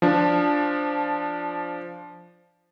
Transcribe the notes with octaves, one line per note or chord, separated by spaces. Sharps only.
F3 D4